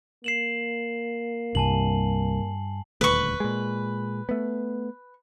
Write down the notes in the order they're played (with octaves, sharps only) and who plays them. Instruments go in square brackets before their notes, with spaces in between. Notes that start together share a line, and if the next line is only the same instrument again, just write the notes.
[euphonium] A#3 [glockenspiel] C7 E7 F#7
[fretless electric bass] C2 [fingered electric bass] G2 [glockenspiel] G#5 A5 F#7
[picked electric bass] D#1 D2 [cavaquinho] B4 C#6
[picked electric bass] A#2 G#3
A3 B3